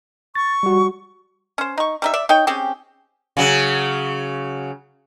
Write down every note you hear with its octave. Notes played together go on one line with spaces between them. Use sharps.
C#6 A6
G3 F#4
C#4 C5
D#4 C#6
G3 D#4 E5
D5 E5
D#4 C#5 G5
C4 C#4 G4 G#4
C#3 F#3